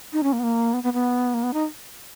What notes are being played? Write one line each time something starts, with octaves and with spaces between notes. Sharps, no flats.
D#4
C#4
A#3
B3
A#3
B3
B3
B3
A#3
B3
D#4